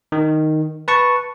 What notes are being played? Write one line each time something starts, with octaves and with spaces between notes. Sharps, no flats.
D#3
B4 A5 C#6